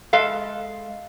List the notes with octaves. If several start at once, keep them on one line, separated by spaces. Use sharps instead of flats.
G#3 A4 F5